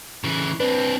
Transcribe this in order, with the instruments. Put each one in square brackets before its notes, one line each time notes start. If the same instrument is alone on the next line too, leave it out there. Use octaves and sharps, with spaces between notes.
[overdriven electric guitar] C#3 E3
[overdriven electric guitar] C4 D4 [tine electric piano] B4